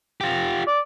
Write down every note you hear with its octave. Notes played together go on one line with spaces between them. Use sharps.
F4 G4
D5